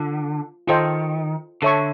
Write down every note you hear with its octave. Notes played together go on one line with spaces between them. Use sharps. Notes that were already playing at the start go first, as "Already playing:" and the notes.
Already playing: D3 F4
D#3 F4 A4 C5 D#5 G5
D3 A4 C#5 E5 A5 C#6